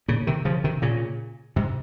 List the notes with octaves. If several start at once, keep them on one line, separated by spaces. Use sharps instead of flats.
A#2 C#3
C3 D#3
C#3 F3
C3 D#3
A#2 C#3
G#2 C3